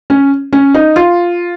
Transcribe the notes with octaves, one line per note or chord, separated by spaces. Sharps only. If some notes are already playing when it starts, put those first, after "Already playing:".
C#4
C#4
D#4
F4